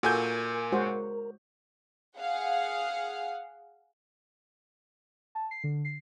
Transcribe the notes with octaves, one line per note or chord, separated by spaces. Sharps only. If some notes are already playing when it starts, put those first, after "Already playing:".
A#2 F#4 A4 A#4 G#5 G6
G#3 F#4 C5
G#4 F5 F#5
A5
C7
D3
C7